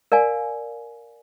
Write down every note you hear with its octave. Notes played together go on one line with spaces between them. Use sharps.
A#4 D5 F5 G#5